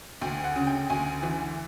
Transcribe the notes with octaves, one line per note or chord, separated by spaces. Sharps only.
D2 G5
F#5
C#3
G5
D2 G#5
E3